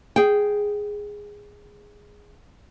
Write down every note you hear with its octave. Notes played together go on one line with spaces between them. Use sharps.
G#4 G5